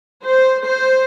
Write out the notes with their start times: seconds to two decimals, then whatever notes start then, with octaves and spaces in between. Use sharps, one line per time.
0.25 C5
0.64 C5